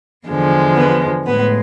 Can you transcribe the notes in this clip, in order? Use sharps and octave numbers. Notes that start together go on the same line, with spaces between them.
E2 D3 F3 G#3
B3
A2 G#3 B3